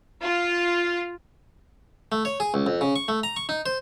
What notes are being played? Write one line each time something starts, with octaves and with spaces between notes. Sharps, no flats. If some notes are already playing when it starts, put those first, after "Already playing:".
F4
A3
C#5
G#4
C#2
F2
C#3
C#6
A3
A#5
C#6
D#4
C5